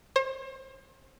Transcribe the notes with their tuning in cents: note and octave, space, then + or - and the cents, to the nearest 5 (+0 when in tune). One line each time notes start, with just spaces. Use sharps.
C5 +40